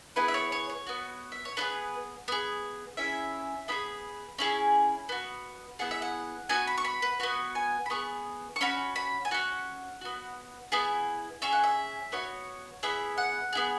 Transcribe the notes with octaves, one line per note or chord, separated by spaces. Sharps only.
B3 E4 G#4 B4
E5
C#5
C#5
C#5
B3 F#4
E5
C#5
B3 E4 G#4 B4
B3 G#4
C#4 E4 G#4 E5
B3 E4 G#4 B5
C#4 E4 G#4
B3 F#4
B3 E4 G#4 F#5
E5
F#5
B3 F#4 G#5
B5
C#6
B5
B4
B3 F#4 C#5
G#5
B5
B3 G#4 C#6
C#6
C#4 F#4 B5
B5
G#5
C#4 F#4 F#5
B3 F#4
B3 E4 G#4
C#4 G#4 E5
F#5
E5
B3 F#4 C#5
B3 E4 G#4 E5
F#5
B3 E4 G#4